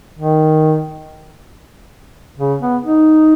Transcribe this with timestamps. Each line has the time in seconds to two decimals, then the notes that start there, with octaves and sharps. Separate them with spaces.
0.19 D#3
2.39 C#3
2.60 B3
2.83 D#4